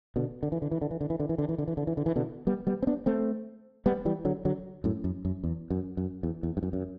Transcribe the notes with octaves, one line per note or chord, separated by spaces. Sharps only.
B2 D3
D3
E3
D3
E3
D3
E3
D3
E3
D3
E3
D3
E3
D3
E3
D3
E3
D3
E3
B2 D3
G3 B3
G3 B3
C4
B3 D4
A3 C4
G3 B3
E3 G3
D3 F#3
D3 F#3
F#2 A2
F#2
F#2
E2
F#2
F#2
E2
E2
G2
F#2
F#2